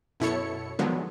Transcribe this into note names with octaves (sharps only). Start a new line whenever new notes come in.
F#2 B2 E4 A4 C#5 C#7
D3 D#3 F3 F#3 G#3 B3